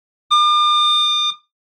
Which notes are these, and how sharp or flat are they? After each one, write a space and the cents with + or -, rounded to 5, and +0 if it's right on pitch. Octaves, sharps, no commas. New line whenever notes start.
D6 +45